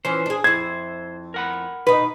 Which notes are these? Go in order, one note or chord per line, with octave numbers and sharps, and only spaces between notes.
E3 F3 C#4 C5
D4 G#4
F2 E4 C5 G#6
A#4 F#5 B5
B2 D#4 B4